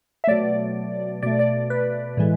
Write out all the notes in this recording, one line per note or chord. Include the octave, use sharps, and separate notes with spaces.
E5
B2 F#3 A3 D5
B2 A3 D5
D5
B4
A2 E3 G#3